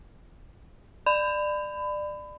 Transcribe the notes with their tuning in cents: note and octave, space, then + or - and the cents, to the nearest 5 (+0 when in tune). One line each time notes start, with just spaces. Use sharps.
D5 +25 B5 +30